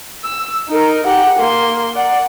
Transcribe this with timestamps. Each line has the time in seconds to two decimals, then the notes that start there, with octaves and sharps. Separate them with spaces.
0.24 E6
0.69 D#4 A#4
1.07 G4 F#5
1.39 A#3 C6
1.95 D5 F#5